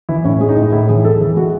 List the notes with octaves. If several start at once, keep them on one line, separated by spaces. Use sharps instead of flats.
E3 E4
A2 C#4
G#3 G#4
D#4
A2 E4
A2 E4
E3 G#4
G#3 A4
E3 G#4
G#3 F#4